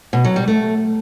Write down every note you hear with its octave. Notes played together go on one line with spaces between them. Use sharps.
B2
F#3
G3
A3